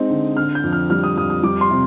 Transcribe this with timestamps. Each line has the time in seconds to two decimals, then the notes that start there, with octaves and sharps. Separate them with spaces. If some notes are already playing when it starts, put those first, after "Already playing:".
Already playing: G#3 C4 D#4
0.10 D3
0.37 D3 F6
0.55 G6
0.63 F2
0.73 F6
0.90 G3 F6
1.04 D#6
1.16 F2 D#6
1.30 D#6
1.43 G3 D6
1.61 C6
1.70 C3